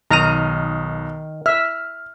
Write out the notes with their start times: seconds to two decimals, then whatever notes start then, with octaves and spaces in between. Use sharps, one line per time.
0.11 B1 D#3 A#5 F6 D#7
1.46 E5 F6